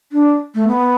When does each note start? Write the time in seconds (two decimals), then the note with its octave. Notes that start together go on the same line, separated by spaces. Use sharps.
0.12 D4
0.55 A3
0.67 B3